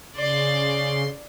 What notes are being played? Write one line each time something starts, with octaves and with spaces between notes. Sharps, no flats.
C#3 D5 C6